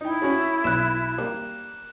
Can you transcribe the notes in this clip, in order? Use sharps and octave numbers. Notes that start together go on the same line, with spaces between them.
D#4 E4 G5
C#4 F#4 G#4
B1 F#6 E7
G3 A#3